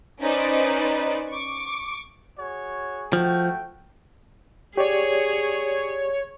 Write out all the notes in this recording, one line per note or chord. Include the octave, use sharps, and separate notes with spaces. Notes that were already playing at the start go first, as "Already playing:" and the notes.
C#4 D#4 B4 C5 D5
C#6 D6
F#4 G#4 C#5
F3 A3 F#4 G5
G4 G#4 C#5 D5